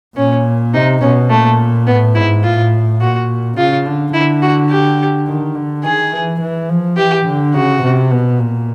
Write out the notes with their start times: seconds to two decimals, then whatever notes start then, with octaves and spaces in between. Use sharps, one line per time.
0.17 A#2 C#4
0.74 C3 D#4
1.01 B2 C#4
1.30 A#2 A3
1.87 A2 B3
2.15 G#2 E4
2.44 A2 F4
3.01 A#2 F#4
3.57 C#3 F4
3.86 D3
4.14 D3 E4
4.42 F#4
4.70 G4
5.28 D#3
5.56 D3
5.84 D#3 G#4
6.13 E3
6.41 E3
6.69 F3
6.97 E3 G4
7.26 D3
7.54 C#3 F#4
7.82 C3
8.11 B2
8.39 A#2